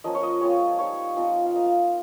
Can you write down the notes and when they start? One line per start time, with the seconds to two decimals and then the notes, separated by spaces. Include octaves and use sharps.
0.04 F3 A#3 C#4 D#5
0.15 C#5
0.23 D#5
0.41 G#3 C4 F4 C#5
0.78 G3 C4 D#4 C#5
1.16 F3 C4 F4 D#5
1.46 F5
1.53 A#3 D#4 D#5
1.66 F5